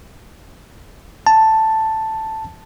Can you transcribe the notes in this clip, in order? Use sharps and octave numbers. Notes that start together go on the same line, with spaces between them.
A5